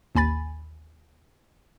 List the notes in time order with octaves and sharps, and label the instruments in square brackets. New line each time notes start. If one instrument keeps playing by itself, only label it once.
[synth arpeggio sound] A1 D#2 G#5 B5 A6